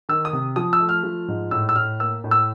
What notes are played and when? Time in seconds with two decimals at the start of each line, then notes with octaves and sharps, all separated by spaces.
0.09 D#3 E6
0.25 D#6
0.33 C3
0.56 F3 D#6
0.73 E6
0.80 A3
0.89 F6
1.04 F3
1.28 G#2
1.51 A2 E6
1.69 E6
1.75 A2 F6
2.00 A#3 E6
2.24 A2
2.31 E6